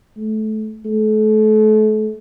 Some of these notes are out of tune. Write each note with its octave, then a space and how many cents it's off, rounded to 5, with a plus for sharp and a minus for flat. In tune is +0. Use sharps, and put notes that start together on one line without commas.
A3 -25
A3 -35